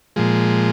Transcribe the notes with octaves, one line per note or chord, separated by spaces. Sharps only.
A#2 F3 G#3